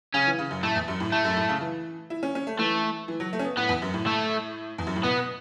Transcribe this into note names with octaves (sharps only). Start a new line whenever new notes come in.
C#3 C#4
E3
C#3
F#2
A2 A3
E2
F#2
A2
A2 A3
F#2
A2
C#3
E3
E4
C#4
C#4
A3
E3 A3
E3
F#3
A3
C#4
B3
A2 B3
E2
F#2
A2
A3
E2
F#2
A2
B2 B3